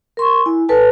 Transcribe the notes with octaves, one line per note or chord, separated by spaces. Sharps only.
A#4 C6 C#6
E4 G#5
A4 B4 G#5 A5